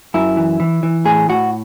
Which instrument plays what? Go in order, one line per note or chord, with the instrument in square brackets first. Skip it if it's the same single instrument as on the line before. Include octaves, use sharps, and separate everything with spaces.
[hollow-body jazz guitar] F#2 E4
E3
E3
E3
A2 G#4
A2 F#4